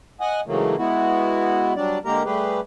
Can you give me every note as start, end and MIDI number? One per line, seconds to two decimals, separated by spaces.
0.21 0.41 75
0.21 0.41 78
0.21 0.41 80
0.46 0.76 44
0.46 0.76 49
0.46 0.76 52
0.46 0.76 54
0.46 0.76 57
0.46 0.76 58
0.78 1.73 56
0.78 1.73 59
0.78 1.73 64
0.78 1.73 66
1.76 1.98 54
1.76 1.98 55
1.76 1.98 62
1.76 1.98 74
2.05 2.23 50
2.05 2.23 56
2.05 2.23 58
2.05 2.23 67
2.05 2.23 70
2.05 2.23 82
2.25 2.60 55
2.25 2.60 57
2.25 2.60 67
2.25 2.60 68
2.25 2.60 71